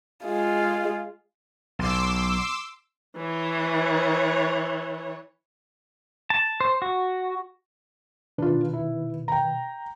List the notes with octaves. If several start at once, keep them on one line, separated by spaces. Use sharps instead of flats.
G#3 F4
B1 B2 C6 D6 E6
E3 C#5
A5
C5
F#4
B2 D#3 D4 F4 B4
E4
G5 A#5